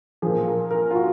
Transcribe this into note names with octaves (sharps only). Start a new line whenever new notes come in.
A#2 F3 G#4
A#4
A#4
F4
F#4